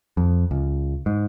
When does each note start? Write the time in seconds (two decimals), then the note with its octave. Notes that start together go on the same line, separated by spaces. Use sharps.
0.17 F2
0.51 C#2
1.06 G#2